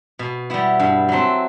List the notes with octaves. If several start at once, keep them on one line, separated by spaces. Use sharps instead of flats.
B2
G3 B3 E4
G2
F#3 A3 C4